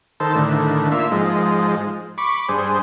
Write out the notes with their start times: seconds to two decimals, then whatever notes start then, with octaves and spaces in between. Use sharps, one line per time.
0.20 D#3 A4 C5
0.35 A2 D3 D#3
0.92 A#3 F4 E5
1.11 G#2 F3 G#3
2.18 B5 C#6 D6
2.49 G2 G#4 C5